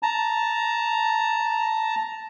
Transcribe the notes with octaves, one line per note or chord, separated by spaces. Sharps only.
A5 A#5